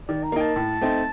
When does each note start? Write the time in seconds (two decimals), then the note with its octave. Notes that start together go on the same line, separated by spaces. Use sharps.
0.08 D#3 D5
0.24 A#5
0.32 A#3 D#4 G5
0.41 A5
0.56 A2
0.81 A3 C4 D#4